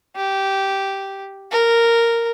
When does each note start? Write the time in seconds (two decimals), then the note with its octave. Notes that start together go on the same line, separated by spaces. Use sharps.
0.16 G4
1.51 A#4